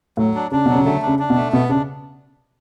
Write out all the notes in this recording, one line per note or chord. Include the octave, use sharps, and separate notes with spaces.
A2 F#3
D4
C#3 D4
B2 F#3
C#3
D3 A3
C#3 D4
D4
B2
A3
B2 B3
C#3 D4